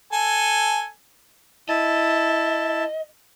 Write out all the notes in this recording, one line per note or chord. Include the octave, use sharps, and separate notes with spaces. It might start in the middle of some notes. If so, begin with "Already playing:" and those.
A4 G#5
E4 D#5 A5